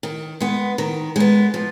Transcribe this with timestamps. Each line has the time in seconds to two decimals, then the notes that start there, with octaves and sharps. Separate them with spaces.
0.03 D#3
0.40 G#3 B3
0.78 D#3
1.16 G#3 B3
1.54 F3